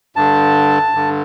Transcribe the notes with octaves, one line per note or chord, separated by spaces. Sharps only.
G2 D3 A5
G2 D3